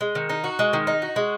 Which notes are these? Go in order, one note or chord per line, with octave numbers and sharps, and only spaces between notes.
G#3
D#3
D#4
F#4
G#3
D#3
D#4
F#4
G#3